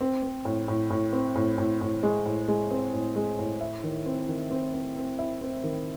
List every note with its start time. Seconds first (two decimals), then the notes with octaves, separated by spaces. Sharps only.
0.01 C4
0.23 C4
0.45 A2
0.68 A2
0.90 A2
1.13 C4
1.36 A2
1.58 A2
1.81 A2
2.03 G#3
2.26 A2
2.48 G#3
2.71 C4
2.93 A2
3.16 G#3
3.39 A2
3.61 E4
3.84 D#3
4.06 C4
4.28 D#3
4.51 C4
4.74 C4
4.96 C4
5.19 E4
5.41 C4
5.64 D#3